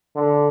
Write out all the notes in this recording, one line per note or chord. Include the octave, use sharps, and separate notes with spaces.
D3